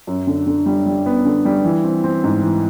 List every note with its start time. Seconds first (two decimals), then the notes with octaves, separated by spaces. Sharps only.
0.07 F#2
0.27 D3
0.46 D3
0.66 G3
0.86 G3
1.06 B3
1.25 D3
1.45 G3
1.64 E3
1.84 C4
2.04 C4
2.24 G#2
2.43 E3